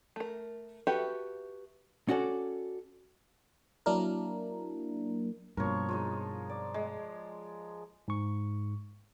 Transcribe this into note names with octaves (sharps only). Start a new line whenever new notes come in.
A3 A#4
F#4 G4 A4 B4 E5
C#4 F#4 A4 D5
F#3 A#3 D4 E4 A#4
G2 B2 F3 A#3 A#4 C#5 C#6
F3 G#3 D#4
D5
G#3
G#2 C#6